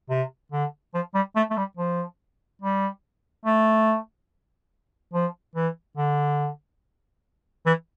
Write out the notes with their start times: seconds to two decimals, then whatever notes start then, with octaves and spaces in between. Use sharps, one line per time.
0.10 C3
0.52 D3
0.94 F3
1.14 G3
1.36 A3
1.50 A3
1.57 G3
1.77 F3
2.62 G3
3.45 A3
5.13 F3
5.55 E3
5.97 D3
7.66 E3